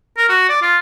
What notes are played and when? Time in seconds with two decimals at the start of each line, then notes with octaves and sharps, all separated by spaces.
0.17 A#4
0.29 F#4
0.49 D5
0.62 F4